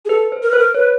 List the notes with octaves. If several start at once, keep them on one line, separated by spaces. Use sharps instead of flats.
G#4
A4 B4
C5
A#4
B4 C5
A#4
B4 C#5